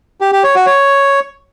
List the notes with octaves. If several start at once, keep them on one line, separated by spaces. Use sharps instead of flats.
G4
G4
C#5
F#4
C#5